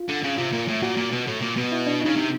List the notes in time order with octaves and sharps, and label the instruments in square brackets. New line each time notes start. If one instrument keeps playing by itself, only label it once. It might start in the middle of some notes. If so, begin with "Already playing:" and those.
Already playing: [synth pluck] F4
[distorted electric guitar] D3
C#3
[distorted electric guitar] C3 [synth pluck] F4
[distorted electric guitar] A#2
A2
[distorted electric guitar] A#2 [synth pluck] F#4
[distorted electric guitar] A#2
B2
A2
A#2
B2
[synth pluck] E4
D4
[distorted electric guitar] C#3 [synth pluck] D#4
[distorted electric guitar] C3